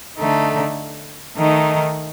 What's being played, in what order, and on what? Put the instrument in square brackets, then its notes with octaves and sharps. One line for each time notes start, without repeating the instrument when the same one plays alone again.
[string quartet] D3 A3 D#4
D#3 A3 D#4